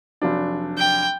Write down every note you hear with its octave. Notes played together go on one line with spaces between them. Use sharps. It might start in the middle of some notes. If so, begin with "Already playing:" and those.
F1 F#3 D4
G5